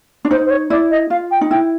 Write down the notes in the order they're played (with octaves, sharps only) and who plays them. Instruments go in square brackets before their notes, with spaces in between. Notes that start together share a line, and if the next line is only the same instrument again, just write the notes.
[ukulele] D4
[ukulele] D#4 [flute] C5
[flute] C5
C#5
[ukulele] E4 [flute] D5
[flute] D#5
[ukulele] F4 [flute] F5
[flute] G5
[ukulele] D#4
[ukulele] E4 [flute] G5